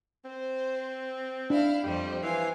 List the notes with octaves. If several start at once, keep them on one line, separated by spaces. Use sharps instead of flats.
C4 C5
D4 E4 F5
F2 G3 G4 C5
E3 C5 F5 G#5